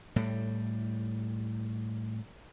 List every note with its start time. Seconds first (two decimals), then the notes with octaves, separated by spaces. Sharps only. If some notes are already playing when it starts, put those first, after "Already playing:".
0.16 A2 G3